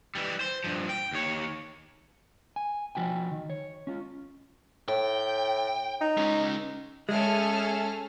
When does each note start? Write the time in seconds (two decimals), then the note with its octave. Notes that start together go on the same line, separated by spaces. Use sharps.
0.15 E3 G3
0.41 C5
0.64 G2 F3
0.89 G5
1.12 D#2 C#5
2.56 G#5
2.95 F3 F#4 G5 G#5
3.31 D#3
3.50 C#5
3.87 C#4 F4
4.88 A2 G5
6.01 D#4
6.17 G#3 C#4
7.09 G#3 A3 C#4 G#4 A4 E5 F6